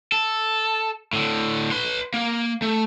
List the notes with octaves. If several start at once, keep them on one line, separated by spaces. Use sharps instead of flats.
A4
A2 D3
B4 C6
A#3
A3